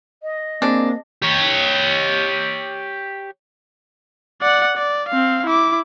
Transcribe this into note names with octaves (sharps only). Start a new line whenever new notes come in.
D#5
A#3 C4 D4 G#4
G4 C#5
D5 F#5
D5
C4 F5
E4 D6